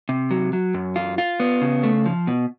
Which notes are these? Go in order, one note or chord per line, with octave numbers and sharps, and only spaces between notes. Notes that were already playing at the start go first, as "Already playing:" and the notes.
C3
F#3
F#3
F#2
F4
F4
B3
C#3
A3
F3
B2